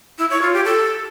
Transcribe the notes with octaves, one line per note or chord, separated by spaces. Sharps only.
E4
C#5
F4
G4
A4